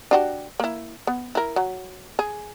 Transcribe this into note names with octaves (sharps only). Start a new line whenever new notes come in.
D4 F#4 G4
A#3 E4
B3
E4 A#4
F#3
G#4